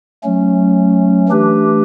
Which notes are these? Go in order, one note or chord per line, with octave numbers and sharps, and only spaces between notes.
F#3 A3 C#4
E3 A3 D4 G4 B4